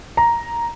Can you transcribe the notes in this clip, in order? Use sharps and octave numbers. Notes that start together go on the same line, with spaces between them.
A#5